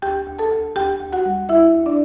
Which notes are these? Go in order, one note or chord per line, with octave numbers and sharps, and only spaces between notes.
D2 G4 G5
D2
A4 A5
D2
D2 G4 G5
D2
F#4 F#5
G3
D2 E4 E5
D2
D4 D5